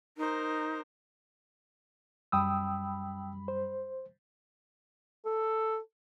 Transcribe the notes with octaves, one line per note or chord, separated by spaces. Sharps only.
D#4 A#4 C5
F#2 G3 G5 B5 D#6 E6
C5
A4